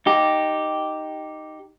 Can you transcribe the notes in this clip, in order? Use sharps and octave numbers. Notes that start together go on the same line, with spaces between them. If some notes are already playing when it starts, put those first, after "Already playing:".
D#4 G4